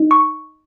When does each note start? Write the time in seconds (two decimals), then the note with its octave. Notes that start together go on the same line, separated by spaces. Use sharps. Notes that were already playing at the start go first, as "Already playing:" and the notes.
Already playing: D#4
0.11 C#6